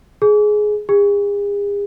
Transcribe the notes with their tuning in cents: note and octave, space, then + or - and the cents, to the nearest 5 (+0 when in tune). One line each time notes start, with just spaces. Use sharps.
G#4 +15
G#4 -40